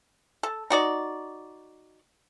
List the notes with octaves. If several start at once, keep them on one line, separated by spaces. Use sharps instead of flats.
A4
D#4 F#4 D5